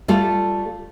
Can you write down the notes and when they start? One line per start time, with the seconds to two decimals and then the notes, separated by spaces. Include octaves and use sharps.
0.08 G3 A3 F4 A4